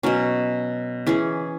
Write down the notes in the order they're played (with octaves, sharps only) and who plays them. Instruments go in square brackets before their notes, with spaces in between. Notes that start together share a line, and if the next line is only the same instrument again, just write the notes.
[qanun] B2 F#3 C#4
E3 C#4 G#4